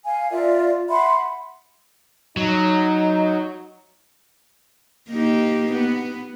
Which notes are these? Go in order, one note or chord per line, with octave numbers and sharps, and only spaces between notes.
F5 G#5
F4 A#4 D5 E5
E5 F#5 B5 C6
F#3 D#4
A#3 D#4 G4
B3